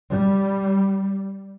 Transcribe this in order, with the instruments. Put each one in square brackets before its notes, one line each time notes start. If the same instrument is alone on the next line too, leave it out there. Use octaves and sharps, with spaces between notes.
[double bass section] G3